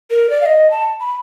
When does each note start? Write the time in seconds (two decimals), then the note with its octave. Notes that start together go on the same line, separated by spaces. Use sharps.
0.11 A#4
0.30 D5
0.41 F5
0.46 D#5
0.71 A5
1.00 B5